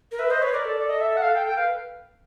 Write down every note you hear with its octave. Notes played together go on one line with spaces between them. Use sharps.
A#4
B4 E5
C5 D#5
B4 C#5
A#4 D5
A4 D5
D5
D#5
E5
E5
F#5
F5
G5
G5
B4 F5